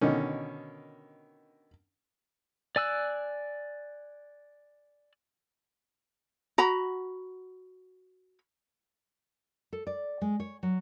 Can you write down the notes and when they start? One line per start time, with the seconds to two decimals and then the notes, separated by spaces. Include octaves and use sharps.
0.01 B2 D3 D#3 C#4
2.76 D5 G#5 E6 F#6
6.58 F#4 A#5 B5
9.73 A4
9.87 D5
10.22 G#3
10.40 C#5
10.63 F#3